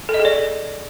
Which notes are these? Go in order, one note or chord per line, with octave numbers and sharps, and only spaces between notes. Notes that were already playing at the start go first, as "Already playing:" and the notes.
A4
D#5
G#4
D5